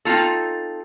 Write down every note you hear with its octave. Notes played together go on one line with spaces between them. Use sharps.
C4 D#4 F4 A4